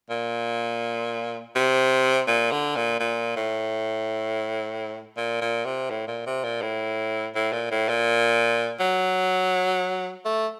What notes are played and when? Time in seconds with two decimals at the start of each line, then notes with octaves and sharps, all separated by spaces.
0.10 A#2
1.55 C3
2.27 A#2
2.52 D3
2.76 A#2
3.00 A#2
3.36 A2
5.17 A#2
5.41 A#2
5.65 C3
5.90 A2
6.07 A#2
6.27 C3
6.44 A#2
6.62 A2
7.35 A2
7.53 A#2
7.71 A2
7.89 A#2
8.80 F#3
10.25 A3